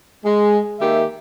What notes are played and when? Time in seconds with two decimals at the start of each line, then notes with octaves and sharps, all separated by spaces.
0.25 G#3
0.80 D#3 A#3 G4 E5